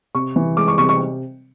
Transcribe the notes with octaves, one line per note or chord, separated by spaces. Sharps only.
C3 C#6
E3
G#3 D6
C#6
C3 C#6
C#6